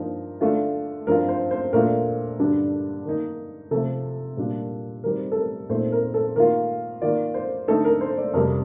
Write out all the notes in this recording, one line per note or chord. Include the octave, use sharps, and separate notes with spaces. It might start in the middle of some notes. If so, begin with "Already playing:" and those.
Already playing: G2 F3 A#3 D#4 A#4
D3 A3 D4 F4
G2 F3 C4 F4 A#4
C5
C5
A#2 A3 D4 F4 A#4
G2 D3 G3 D4
D#3 A#3 D#4
C3 F3 A3 C4 A4
A#2 G3 D4 F4
D#3 G3 C4 A#4
A4
A#4
A#2 A3 C4 D#4 C5
A#4
A4
D#3 A#3 F4 A#4
D#3 A#3 F4 D5
C5
D3 A3 D#4 A4
A#4
C5
D5
F2 C3 G3 A#4